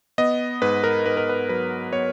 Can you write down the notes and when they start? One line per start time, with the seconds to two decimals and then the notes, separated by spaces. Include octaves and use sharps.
0.18 B3 D#5
0.62 G#2 B4
0.84 A#4
1.05 G#2 B4
1.17 A#4
1.29 B4
1.49 F#3 B4
1.92 B3 C#5